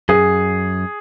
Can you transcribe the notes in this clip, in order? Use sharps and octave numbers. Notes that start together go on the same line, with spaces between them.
F#2 G#4